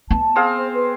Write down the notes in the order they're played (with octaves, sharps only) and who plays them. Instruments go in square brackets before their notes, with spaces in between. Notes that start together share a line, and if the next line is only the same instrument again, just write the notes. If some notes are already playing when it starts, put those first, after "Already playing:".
[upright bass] B3 [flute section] A5
[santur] C4 G#4 F5
[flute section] C5
B4